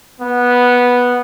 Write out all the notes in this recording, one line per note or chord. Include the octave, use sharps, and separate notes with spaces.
B3